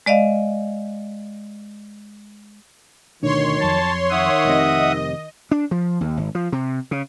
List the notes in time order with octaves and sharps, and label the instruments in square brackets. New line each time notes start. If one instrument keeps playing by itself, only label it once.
[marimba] G#3 D5 D#5 F5
[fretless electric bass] D2 B2 D4 [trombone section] D#3 [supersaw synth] C#5 C6
[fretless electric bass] F2 F#3 [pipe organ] A5
[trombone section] D#3 [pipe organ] E5 F#5 D#6
[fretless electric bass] F1 C3 [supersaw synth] D#5
[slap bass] D4
F3
D#2
G#1
F3
C3
C#3